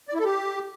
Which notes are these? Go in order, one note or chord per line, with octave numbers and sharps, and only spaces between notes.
D5
E4
A4
G4